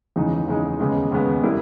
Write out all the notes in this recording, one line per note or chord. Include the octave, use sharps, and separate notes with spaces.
E2 C#3 E3 G#3 D#4
E2 C#3 E3 G#3 D#4
D#2 C#3 G#3 B3
D#2 C#3 G#3 B3
G3 A#3 E4